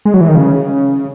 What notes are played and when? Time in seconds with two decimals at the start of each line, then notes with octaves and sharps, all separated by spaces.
0.05 G#3
0.14 F#3
0.21 E3
0.28 D#3
0.35 C#3